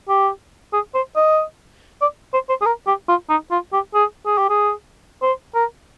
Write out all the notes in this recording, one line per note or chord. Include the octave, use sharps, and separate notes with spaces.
G4
G#4
C5
D#5
D5
C5
C5
G#4
A#4
G4
F4
D#4
F4
G4
G#4
G#4
G4
G#4
C5
A#4